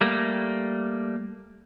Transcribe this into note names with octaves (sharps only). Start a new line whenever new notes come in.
G3 A3 A#3